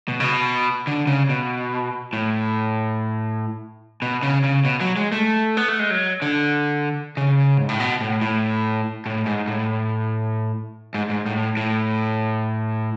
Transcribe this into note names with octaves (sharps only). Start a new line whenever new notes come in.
B2
C#3
B2
D3
C#3
B2
A2
B2
C#3
C#3
B2
F#3
G#3
A3
B3
A3
G#3
F#3
D3
C#3
G#2
A2
B2
A2
A2
A2
G#2
A2
G#2
G#2
A2
A2